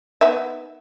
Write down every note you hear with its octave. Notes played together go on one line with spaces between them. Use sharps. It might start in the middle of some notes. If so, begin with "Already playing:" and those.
B3 D#4 E5